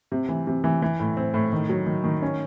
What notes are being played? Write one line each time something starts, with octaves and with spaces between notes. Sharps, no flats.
C3
E3
C3
E3
E3
A2
C4
A2
D#3
F#3
D#3
D#3
C#4